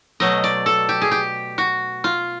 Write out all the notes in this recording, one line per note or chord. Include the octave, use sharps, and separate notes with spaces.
B2 F#3 A3 D#5
D5
A4
G4
G#4
G4
F#4
F4